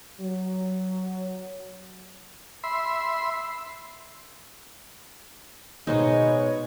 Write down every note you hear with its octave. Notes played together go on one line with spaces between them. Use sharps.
F#3
E5 B5 C6
B2 G#3 D#4 C5 C#5 D#5